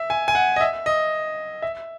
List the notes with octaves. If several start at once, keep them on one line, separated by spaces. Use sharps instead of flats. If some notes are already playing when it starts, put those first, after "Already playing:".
Already playing: E5
G#5
G#5
F#5
D#5
E5
D#5
E5